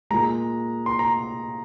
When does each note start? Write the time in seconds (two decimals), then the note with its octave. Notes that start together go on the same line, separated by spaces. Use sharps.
0.10 A#2 G#3 A#5
0.86 C6
0.99 A#5